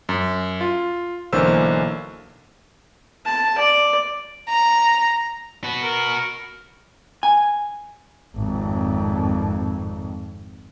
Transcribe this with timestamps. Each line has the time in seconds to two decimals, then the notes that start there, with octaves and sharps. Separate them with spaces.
0.09 F#2
0.61 F4
1.33 B1 D3 E3 A#3 C5 E6
3.25 A5
3.58 D5
4.49 A#5
5.64 F#4 B4
5.83 A#4
7.23 G#5
8.35 G#1 F2